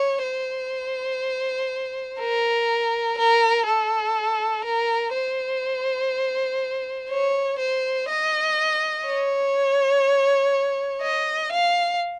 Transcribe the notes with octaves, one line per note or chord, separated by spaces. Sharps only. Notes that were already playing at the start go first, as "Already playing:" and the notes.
Already playing: C#5
C5
A#4
A#4
A4
A#4
C5
C#5
C5
D#5
C#5
D#5
F5